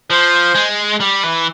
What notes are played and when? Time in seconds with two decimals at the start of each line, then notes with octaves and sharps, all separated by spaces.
0.10 F3 C5
0.55 G#3
1.00 G3
1.24 E3